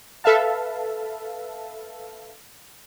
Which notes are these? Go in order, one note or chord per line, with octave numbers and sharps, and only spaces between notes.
A4 B4 E5 F5 A5